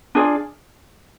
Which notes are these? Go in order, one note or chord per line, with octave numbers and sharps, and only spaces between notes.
D4 F4 G#4 D5